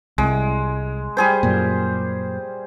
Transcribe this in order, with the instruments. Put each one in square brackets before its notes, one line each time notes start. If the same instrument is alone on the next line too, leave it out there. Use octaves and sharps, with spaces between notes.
[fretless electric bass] C2 [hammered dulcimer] G#3
[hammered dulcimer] G3 G#4 C5
[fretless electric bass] F#2 A#2